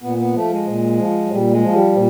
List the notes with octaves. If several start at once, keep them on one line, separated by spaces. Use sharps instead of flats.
A#2 B3
B3
F3 A3
G#3
A#2
F3
F#3
A#2 G3
G#3
F3
G3
A#2